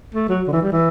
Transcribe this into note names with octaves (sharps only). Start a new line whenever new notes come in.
A3
F#3
D3
E3
G3
E3